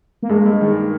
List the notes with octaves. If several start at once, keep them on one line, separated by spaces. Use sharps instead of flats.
A#3
G2 G#3
G2
D#3
A#3